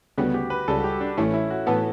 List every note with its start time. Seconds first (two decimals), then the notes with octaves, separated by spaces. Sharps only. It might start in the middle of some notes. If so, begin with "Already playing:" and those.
0.17 D2 C#3 G3 B3 F#4
0.34 G4
0.50 B4
0.68 C#2 C#3 G3 A4
0.77 F#4
0.84 G4
1.01 D4
1.17 A1 A2 E3 A3 C#4
1.34 E4
1.51 F#4
1.67 A2 E3 B3 A4